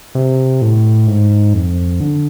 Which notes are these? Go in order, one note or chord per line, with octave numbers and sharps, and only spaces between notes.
C3
A2
G#2
F2
D3